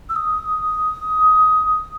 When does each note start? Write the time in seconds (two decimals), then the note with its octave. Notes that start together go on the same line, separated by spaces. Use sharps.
0.09 E6
0.16 D#6